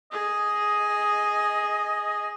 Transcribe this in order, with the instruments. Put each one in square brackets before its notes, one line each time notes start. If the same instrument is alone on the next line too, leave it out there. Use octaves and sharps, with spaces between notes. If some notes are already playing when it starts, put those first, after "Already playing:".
[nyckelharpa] G#4 [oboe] D#5